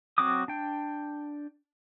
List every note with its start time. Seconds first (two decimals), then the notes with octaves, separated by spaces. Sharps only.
0.18 F#3 C4 F#4 D6 D#6
0.48 D4 G5